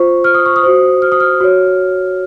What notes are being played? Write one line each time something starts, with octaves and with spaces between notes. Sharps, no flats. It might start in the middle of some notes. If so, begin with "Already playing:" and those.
Already playing: F4 C5 C#6
F6
D#6
C#6
D#6
F#4 C5
F6
D#6
F6
F#4 C#5